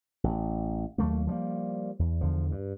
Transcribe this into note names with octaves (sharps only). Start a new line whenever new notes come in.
A1
D#2 F#3 A3 A#3
F3 G3 G#3 A#3
E2
E2 D3 F3
G2